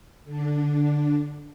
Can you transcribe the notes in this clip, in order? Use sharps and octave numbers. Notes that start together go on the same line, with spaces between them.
D3 D4